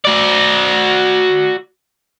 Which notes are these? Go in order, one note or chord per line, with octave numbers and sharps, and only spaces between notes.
F#4 D5